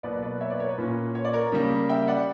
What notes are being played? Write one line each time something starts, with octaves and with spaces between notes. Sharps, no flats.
B2 F#3 A#3 B4 D5
B4 D5
C#5 E5
B4 D5
A#4 C#5
B4
A#2 A#3 C#4
C#5
D5
A#4 C#5
C#3 G3 A#3
E5 G5
D5 F#5